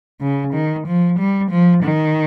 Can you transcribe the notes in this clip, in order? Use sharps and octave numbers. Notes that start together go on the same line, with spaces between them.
C#3
D#3
F3
G3
F3
D#3